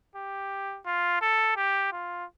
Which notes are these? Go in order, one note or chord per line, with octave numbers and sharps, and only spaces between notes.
G4
F4
A4
G4
F4